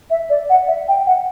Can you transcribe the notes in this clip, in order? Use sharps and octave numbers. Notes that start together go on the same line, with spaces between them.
E5
D5
F#5
E5
G5
F#5